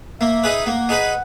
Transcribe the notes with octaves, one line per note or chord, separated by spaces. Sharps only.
A#3 E5
D#4 G#4 B4
A#3 F#5
D#4 G#4 B4